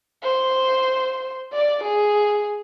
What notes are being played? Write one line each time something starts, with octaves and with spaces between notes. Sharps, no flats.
C5
D5
G#4